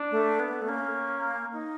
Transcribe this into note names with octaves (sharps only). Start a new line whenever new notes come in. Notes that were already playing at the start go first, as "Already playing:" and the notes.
Already playing: D4
A3
B3
A3
A#3 C#4
D#4